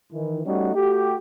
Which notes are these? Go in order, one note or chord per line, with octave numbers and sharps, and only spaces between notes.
D#3 E3
G3 A3 C#4 D#4 F#4
A3 F#4 G4